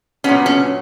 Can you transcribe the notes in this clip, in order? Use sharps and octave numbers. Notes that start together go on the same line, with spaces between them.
A#2 F#3 B3 C#4
C#4